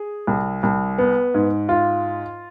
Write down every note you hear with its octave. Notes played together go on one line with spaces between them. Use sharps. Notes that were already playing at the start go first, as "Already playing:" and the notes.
Already playing: G#4
C2
C2
B3
G#2
F4